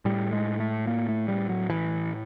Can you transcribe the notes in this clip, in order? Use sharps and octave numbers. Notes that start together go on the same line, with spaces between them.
A2 G3
G#3
A3
A#3
A3
G3
F#3
E3